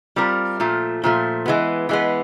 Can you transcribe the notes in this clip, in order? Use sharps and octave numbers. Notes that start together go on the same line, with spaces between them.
G3 C4 F4 A#4
A#2 F3 A3
A#2 F3 A3
E3 G#3 B3
E3 G#3 B3